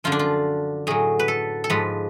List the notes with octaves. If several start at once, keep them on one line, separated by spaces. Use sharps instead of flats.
F#2 D3 F3 F4
D4
F4
A2 F#3 G#4
B4
A4
A4
G#2 F3 B4